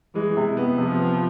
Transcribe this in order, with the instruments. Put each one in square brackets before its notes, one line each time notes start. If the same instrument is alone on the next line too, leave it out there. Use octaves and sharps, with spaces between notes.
[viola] E3 [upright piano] G#3
[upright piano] C3
B3
[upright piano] C3 [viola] F3
[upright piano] B3